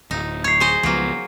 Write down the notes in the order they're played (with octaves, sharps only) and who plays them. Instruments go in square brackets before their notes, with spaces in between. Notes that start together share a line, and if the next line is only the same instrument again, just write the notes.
[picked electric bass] D1 [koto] D#4
[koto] C#5 [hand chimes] G#6 C7
[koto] G#4 C5 D#5
[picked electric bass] C#2 F3 B3 [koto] F#3 A#3